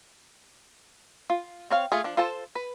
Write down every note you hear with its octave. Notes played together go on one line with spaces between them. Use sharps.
F4
C4 C#5 F5
A3 F4 G#4
F3 D4
F4 A4 C5 A5
B4